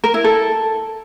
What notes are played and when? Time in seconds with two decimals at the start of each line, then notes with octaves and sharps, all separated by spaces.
0.04 A#4
0.14 E4
0.24 A4